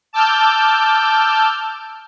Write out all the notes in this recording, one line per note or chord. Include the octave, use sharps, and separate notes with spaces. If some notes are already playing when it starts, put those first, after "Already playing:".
A5 D6 E6 F6 G6